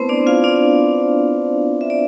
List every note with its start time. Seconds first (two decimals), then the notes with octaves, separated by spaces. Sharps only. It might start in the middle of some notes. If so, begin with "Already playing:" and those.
Already playing: A3 B3 C4 E4 B4 C5
0.09 D4 D5
0.27 F4 F5
0.44 D4 D5
1.81 E5
1.90 D5